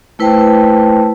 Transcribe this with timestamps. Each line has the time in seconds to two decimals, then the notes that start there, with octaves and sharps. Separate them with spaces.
0.19 A3 E4 B4 C5 G5 A5